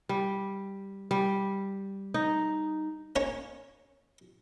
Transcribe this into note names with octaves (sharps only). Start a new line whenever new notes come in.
G3
G3
D#4
A#3 C#4 C#5